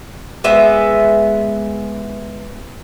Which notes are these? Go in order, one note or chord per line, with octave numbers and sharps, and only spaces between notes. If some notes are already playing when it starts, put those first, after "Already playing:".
G#3 B3 E5